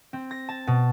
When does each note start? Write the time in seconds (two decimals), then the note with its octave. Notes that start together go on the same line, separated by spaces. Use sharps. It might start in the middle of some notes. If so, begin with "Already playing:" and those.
0.13 C4
0.31 A#6
0.49 A5
0.67 B2